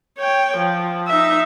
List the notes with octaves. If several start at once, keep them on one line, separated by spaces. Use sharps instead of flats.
C#5 G5
F3
D#4 E5